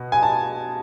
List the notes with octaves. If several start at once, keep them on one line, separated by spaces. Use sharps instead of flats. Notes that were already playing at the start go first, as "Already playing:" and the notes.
Already playing: B2
G#5
A5